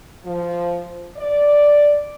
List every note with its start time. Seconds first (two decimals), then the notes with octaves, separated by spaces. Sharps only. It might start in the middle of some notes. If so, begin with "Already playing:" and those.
0.25 F3
1.17 D5